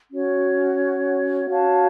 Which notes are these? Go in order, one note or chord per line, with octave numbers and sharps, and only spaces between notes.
C#4 F#4 C#5
F#4 C#5 F5 A5